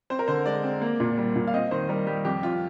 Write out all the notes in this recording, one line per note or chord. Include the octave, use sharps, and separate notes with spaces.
C4 C5
A#4
D3 C5
G#3 D5
C4
A#3
A#2
G3
A#2
F5
C4 D#5
D#3 C5
G3 A#4
G3 G4
F2 G4
F2 F4